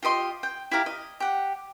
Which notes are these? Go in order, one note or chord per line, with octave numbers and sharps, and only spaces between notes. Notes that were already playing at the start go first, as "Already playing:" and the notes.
F4 G4 D#5 C6
G5
E4 G4 F5 A#5
D#5
G4 F#5